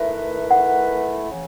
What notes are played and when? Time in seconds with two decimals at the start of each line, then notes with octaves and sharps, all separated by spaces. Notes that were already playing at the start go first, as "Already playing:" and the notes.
Already playing: D#3 A3 E4 B4 E5
0.51 F#5
1.30 C#3 E3